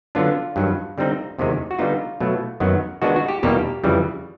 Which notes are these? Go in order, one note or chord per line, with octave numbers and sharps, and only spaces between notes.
D3 F#3 B3 D4 F4
G2 D#3 F#3
D3 G3 C4 D#4
E2 C3 D#3 G#3
F#4
D3 G3 B3 D#4 F4
B2 F#3 A3
F#2 D#3 F#3 B3
D#3 G#3 B3 D4 F#4
F#4
G4
E2 B2 G3 A#3 D#4 G4
F2 C#3 E3 G3